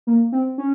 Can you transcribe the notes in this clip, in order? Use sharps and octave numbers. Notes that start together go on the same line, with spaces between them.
A#3
C4
C#4